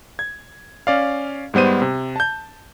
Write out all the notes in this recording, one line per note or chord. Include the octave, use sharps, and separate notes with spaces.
G#6
C#4 D5 F5
G#2 G3 B3 C5 D#7
C3
A5 G6